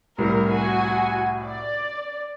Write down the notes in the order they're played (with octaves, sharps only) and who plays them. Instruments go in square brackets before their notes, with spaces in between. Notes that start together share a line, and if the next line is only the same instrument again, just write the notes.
[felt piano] C2 A2 G3 [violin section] A#4
[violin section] F#4 G#5
D5